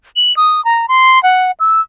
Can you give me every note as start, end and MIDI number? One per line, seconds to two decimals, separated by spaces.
0.16 0.35 102
0.36 0.63 87
0.65 0.86 82
0.88 1.21 84
1.23 1.51 78
1.60 1.81 88